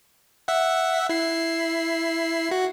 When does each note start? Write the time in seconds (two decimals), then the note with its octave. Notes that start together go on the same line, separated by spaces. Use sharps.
0.48 E5 F#5
1.09 E4 C7
2.51 F#4